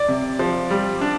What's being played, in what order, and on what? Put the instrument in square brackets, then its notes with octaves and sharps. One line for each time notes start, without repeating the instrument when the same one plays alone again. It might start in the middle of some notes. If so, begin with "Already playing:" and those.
Already playing: [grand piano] D5
[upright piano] C3
F3
G3
D4